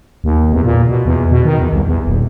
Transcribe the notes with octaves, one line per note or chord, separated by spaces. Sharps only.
D#2
E2
A#2
B2
E2
B2
D#3
E2
C2
E2
D#1